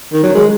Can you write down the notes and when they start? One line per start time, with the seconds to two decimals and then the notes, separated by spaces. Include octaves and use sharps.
0.13 D#3
0.23 F#3
0.35 G#3